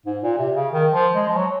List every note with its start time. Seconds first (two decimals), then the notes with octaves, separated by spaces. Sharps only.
0.06 G#2
0.23 A#2
0.38 C3
0.56 C#3
0.72 D#3
0.93 F3
1.14 G#3
1.28 F3
1.36 F#3